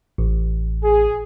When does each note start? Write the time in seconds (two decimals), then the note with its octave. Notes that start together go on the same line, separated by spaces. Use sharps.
0.18 A1
0.84 G#4